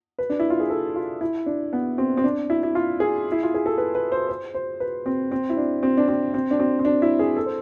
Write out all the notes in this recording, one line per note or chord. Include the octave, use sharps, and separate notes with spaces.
B4
D4
E4
F4
G#4
A4
F4
E4
D4
B3
C4
C4
D4
E4
E4
F4
G#4
E4
F4
G#4
A4
B4
B4
C5
C5
C5
B4
C4
C4
E4
D4
C4
D4
C4
C4
D4
C4
C4
D4
E4
G#4
A4
C5